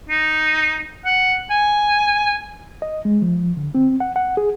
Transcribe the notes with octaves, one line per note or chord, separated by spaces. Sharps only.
D#4
F#5
G#5
D#5
G#3
F3
D3
C4
F#5
F#5
G#4